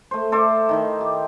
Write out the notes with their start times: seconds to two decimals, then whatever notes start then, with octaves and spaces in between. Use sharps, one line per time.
0.11 A3 C5
0.32 A4 C5 D5 E5
0.69 D#3 D#4 E4
1.01 G4